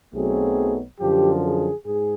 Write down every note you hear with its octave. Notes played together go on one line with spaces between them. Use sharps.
B1 B2 F#3 A3 C4 G#4
F#2 D3 F3 G4
G#4
G#2 G#4